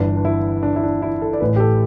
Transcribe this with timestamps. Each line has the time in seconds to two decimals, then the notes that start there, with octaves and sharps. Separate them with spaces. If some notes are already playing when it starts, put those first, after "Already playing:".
Already playing: G1 G2 E3 D4
0.16 D4
0.25 E4
0.63 D4
0.76 E4
0.83 D4
1.02 E4
1.22 A4
1.33 D5
1.40 A1 A2 E3 B4
1.56 G4
1.60 A4